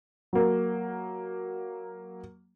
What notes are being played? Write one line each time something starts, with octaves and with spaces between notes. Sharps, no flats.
F#3 A#3